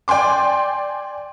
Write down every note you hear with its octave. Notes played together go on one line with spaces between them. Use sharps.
D5 G5 G#5 C6 D6